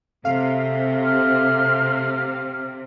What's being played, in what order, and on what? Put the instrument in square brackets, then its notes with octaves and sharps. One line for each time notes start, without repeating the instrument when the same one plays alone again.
[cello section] C3 [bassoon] A3 [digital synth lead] F5
[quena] F6